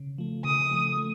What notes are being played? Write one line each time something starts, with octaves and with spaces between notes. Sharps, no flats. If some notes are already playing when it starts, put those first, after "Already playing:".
Already playing: C#3
F3 A3
C#3 D#6
F3 A3
A3